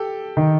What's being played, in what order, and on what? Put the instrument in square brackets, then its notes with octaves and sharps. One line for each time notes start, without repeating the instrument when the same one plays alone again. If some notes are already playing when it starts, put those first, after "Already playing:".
Already playing: [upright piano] G4 A4
[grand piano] D#3